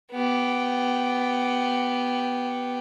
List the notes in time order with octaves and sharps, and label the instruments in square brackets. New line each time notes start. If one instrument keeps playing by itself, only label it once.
[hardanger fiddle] B3 G4